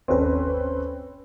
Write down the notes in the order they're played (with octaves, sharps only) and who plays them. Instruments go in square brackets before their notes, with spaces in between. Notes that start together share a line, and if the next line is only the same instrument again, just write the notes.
[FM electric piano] G1 D#2 A4 [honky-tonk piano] C4 C#4 B4